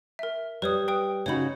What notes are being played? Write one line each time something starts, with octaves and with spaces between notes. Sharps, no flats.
A#4 E5
G3 B4 C#5 D#6
B4 G5 D#6
C#3 D#4 F#4 C#5 B5